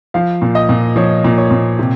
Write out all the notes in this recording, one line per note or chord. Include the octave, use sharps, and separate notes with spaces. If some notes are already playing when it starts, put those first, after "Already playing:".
F3 F5
A#2
D#5
A#2
F3 C#5
A#2
C#5
A#2
C3